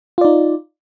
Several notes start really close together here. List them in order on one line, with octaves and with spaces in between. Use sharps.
F4 D5 D#4